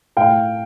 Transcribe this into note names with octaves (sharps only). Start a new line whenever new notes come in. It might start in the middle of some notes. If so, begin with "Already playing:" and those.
A2 F5 G5